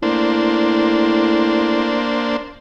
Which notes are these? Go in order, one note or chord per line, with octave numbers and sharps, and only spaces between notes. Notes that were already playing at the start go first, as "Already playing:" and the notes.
A2 A#3 D4 C5